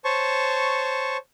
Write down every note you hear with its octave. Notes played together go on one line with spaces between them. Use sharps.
C5 C#5 A5 C#6